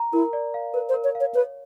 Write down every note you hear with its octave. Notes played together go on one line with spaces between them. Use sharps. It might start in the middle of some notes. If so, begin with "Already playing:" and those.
Already playing: A#5
E4 A#4
D5
F5
A#4 B4
C5
A#4
C#5
F5
C#5
B4 C#5